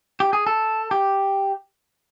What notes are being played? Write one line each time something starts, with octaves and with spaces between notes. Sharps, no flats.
G4
G#4
A4
G4